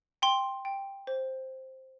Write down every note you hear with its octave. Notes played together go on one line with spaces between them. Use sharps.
G5 C6
G5
C5